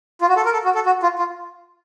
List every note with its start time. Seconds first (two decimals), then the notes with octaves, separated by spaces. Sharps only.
0.21 F4
0.29 F#4
0.37 A4
0.45 A#4
0.53 A4
0.65 F#4
0.75 A4
0.86 F#4
1.03 F4
1.19 F4